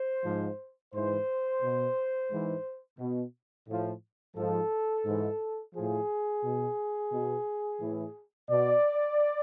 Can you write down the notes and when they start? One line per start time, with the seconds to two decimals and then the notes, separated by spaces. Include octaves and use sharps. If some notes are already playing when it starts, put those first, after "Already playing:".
Already playing: C5
0.25 G#2 F3
0.93 G#2 E3 C5
1.63 B2
2.31 G#2 E3
2.99 B2
3.68 A2 F3
4.36 G#2 F3 A4
5.05 G#2 E3
5.74 A2 F3 G#4
6.43 B2
7.12 B2
7.81 A2 E3
8.49 B2 D5